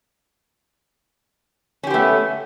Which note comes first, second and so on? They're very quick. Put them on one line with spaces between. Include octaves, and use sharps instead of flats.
C#4 G4 B3 A3